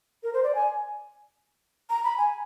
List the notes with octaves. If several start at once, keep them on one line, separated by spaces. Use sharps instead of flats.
A#4
C5
D5
G#5
A#5
B5
G#5